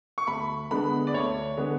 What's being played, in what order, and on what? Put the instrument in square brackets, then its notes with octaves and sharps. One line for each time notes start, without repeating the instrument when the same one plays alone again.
[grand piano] C#6
D2 B5
D3 G#3 B3 D4 B5
D5
D2 C#5
D3 G#3 B3 D4